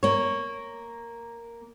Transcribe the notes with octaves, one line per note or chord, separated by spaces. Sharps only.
A#3 C#5